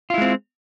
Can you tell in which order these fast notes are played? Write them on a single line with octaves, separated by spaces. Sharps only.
F4 E4 G#3 C4